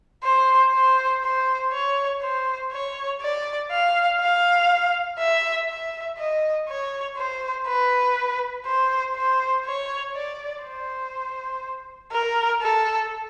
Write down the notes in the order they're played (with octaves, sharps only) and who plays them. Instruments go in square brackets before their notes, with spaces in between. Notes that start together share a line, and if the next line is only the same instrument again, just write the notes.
[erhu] C5
C5
C5
C#5
C5
C#5
D5
F5
F5
E5
E5
D#5
C#5
C5
B4
C5
C5
C#5
D5
C5
A#4
A4